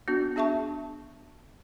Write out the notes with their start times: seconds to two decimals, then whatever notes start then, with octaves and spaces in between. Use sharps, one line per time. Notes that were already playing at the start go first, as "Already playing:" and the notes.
0.08 B3 D4 F#4
0.36 D4 G#4 E5 A5 C#6